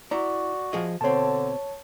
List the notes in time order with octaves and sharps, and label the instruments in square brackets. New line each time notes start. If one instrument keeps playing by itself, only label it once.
[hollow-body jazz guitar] E4 A#5 [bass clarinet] F#4 [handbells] D5
[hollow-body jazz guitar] F3 G#4 D#5
[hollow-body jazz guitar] B2 C4 [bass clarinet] D3 [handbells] C#5 A5